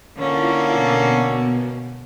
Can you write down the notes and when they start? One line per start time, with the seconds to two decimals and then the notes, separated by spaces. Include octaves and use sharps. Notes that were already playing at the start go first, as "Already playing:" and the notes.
0.17 D3 A#3 C#4 E4 F4
0.71 B2